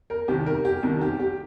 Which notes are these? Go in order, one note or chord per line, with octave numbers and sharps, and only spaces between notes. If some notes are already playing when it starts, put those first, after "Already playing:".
A#4
C2 C3 D#3 G3 G4
A#4
G4
C2 C3 D#3 A#4
G4
G4